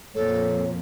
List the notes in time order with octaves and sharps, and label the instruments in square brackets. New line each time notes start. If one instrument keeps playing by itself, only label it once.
[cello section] F2 A#2 [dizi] A4 [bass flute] C#5